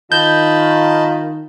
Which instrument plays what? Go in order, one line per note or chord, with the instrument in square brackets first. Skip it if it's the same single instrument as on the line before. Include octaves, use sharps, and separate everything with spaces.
[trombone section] D#3 [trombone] F4 [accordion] D#5 A5 B5 [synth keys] G6